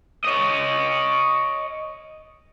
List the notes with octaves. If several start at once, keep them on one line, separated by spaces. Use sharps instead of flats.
C#5 D#5